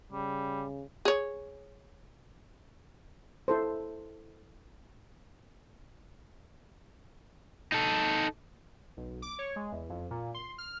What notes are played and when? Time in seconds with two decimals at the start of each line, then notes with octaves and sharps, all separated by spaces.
0.12 C#3 G3
1.05 G#4 C#5
3.48 E4 A4 C5
7.72 D#4 A4
8.97 B1
9.22 D6
9.39 C#5
9.56 G#3
9.72 E2
9.90 F2
10.11 A#2
10.34 C6
10.58 F6